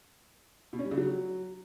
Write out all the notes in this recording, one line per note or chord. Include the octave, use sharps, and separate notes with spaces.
B2
C#4
G3
C#3
F#3